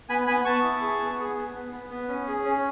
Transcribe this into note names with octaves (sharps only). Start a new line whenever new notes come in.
B3 G#5 B5
B3 G#5 B5
B3 A5 C#6
E4
G#4
B3
G#4
B3
B3
B3
B3
C#4
G#4
C#4